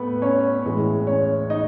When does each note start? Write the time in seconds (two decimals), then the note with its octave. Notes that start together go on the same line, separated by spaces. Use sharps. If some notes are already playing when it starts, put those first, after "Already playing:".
Already playing: A2 A3 B3 B4
0.22 C#4 C#5
0.65 A2 E3 G#3
1.07 C#4 C#5
1.50 D#4 D#5